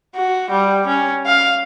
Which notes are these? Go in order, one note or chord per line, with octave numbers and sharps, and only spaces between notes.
F#4
G3
C#4
F5